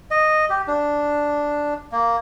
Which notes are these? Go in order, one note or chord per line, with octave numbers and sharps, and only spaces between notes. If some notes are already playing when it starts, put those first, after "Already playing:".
D#5
G4
D4
A#3